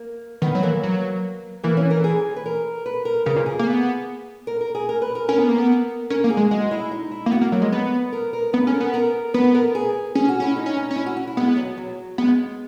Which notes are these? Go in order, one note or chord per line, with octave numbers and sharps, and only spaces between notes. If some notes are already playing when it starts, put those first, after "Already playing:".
Already playing: A#3
D#3 B3
F#3
E3 A#3
F#3
E3 A#3
C#4
A#4
G#4
B4
A#4
B4
A#4
C#3 A#4
A#2
G#4
A#3
B3
A#4
A#4
G#4
A#4
B4
A#4
C#4 A#4
B3
A#3
B3
C#4 A#4
A#3
G#4
G#3
G#3 F#4
E4
D#4
E4
A#3
B3 F#4
A#3
F#3 A#4
G#3
B3 B4
A#4
A#4
B3 B4
C#4 G#4
A#4
B3
A#4
B3 B4
A#4
G#4
C#4 G#4
F#4
C#4 E4
D#4
C#4
D#4
C#4
E4
F#4
F#4
E4
G#3 B3
F#3
F#3
G#3 B3